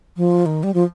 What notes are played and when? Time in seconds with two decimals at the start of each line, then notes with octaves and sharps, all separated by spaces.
0.17 F3
0.46 D#3
0.63 G3
0.74 F3